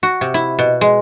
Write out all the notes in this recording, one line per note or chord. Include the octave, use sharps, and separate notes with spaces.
F#4
C3
E4
B2
G#3